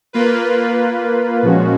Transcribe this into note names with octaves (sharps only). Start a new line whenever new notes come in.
A#3 F4 B4
A#2 F3 G#3 C#4 F#4